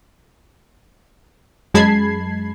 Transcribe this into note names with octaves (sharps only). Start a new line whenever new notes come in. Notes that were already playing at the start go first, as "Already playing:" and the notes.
F#2 G#3 A5 B5 G#6 C7